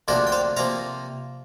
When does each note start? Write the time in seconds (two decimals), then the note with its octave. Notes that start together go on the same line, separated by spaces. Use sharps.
0.08 D2 C3 F3 A#3 D4 A#4 D5
0.27 G5
0.32 C5 F5
0.57 C3 F3 A#3 F5 A#5